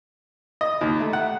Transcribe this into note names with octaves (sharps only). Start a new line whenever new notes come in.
D#5
D#2
A3
F#5